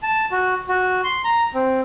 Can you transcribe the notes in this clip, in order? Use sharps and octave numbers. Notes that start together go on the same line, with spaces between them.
A5
F#4
F#4
C6
A#5
C4